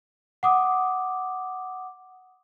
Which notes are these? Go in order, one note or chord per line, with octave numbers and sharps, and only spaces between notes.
F#5 D6 D#6